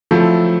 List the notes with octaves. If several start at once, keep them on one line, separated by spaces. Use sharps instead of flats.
F3 F#3 A3 C4 E4 A4